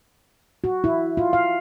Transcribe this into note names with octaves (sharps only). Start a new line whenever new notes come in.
F#4
E4
F4
F5